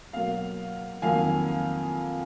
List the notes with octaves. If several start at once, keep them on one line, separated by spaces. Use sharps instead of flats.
B2 F#3 A#3 F5
F2 D#3 F#3 A#3 F5 G#5